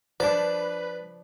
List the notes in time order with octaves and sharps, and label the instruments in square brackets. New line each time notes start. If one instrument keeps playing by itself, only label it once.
[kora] F3 D4 [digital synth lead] B4 [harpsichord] D5